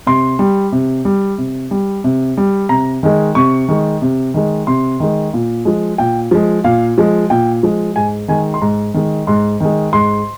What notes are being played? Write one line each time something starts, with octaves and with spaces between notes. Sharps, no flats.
C3 C6
G3
C3
G3
C3
G3
C3
G3
C3 A#5
D#3 G#3
C3 C#6
D#3 G#3
C3
D#3 G#3
C3 C6
D#3 G#3
A#2
F3 G#3
A#2 G5
F3 G#3
A#2 F5
F3 G#3
A#2 G5
F3 G#3
G#2 G#5
D#3 G#3 G#5
C6
G#2 A#5
D#3 G#3
G#2 C6
D#3 G#3
G#2 C6